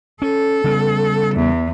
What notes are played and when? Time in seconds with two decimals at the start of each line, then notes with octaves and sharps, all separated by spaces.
0.22 C#4 A4
0.64 C#3 G3 B3
1.35 E2